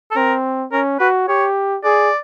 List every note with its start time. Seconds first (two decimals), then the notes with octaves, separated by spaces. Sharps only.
0.11 A4
0.16 C4 A#4
0.72 C#4 A#4
0.99 F#4 B4
1.28 G4 C#5
1.84 G#4 D5